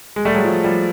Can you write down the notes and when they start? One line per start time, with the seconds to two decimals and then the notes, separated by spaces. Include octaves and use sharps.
0.16 G#3
0.25 G3 A3
0.34 F#3 G#3
0.45 F3
0.64 F3 G3